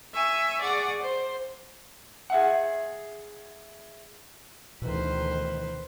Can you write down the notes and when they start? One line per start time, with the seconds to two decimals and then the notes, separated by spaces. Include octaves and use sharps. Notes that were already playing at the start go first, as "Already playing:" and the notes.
0.13 E5 G#5 C#6
0.61 G#4 D5 F#5 C#6
1.00 C5
2.30 G#4 E5 F#5
4.82 D2 B2 D#3 E3 B4 C5